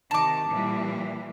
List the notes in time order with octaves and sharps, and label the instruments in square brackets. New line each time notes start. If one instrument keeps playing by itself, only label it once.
[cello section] C3 D#3 [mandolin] A5 D6
[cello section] A#2 E3 G3